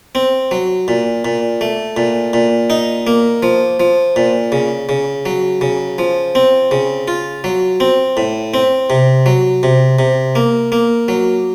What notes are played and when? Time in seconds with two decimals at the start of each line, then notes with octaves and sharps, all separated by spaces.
0.15 C4
0.51 F#3
0.88 A#2
1.25 A#2
1.61 A3
1.97 A#2
2.33 A#2
2.70 D#4
3.07 A#3
3.43 F3
3.80 F3
4.16 A#2
4.52 C#3
4.89 C#3
5.26 F#3
5.61 C#3
5.98 F3
6.35 C4
6.71 C#3
7.08 F4
7.44 F#3
7.80 C4
8.17 A2
8.54 C4
8.90 C3
9.26 F#3
9.63 C3
9.99 C3
10.35 A#3
10.72 A#3
11.08 F#3